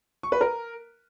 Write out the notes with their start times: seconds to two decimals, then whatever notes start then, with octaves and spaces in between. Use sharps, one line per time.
0.23 C#6
0.32 B4
0.41 A#4